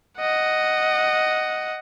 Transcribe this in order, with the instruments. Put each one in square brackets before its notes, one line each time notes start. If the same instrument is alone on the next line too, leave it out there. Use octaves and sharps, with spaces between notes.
[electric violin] D#5 F#5